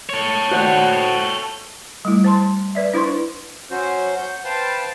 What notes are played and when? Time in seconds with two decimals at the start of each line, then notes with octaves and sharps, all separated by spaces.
0.09 A4 C#5
0.51 F#4 C5 F#5
2.05 G3 A3 E4
2.24 C5 A5 C6
2.75 B4 D5 E5
2.94 D4 E4 B4 C5 C6 C#6
3.71 F#3 C#4 F#4 C5
4.17 F#5 G6
4.45 B4 C5 F5 G5 A5